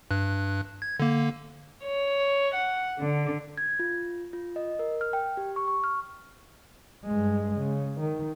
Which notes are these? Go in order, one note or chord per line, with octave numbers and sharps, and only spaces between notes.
G2 F#6
G#6
D3 A#3
C#5
F#5
D3
G#6
F4
F4
D#5
A#4
F6
G5
G4
C#6
C#6
F6
G2 G#3
C#3
D#3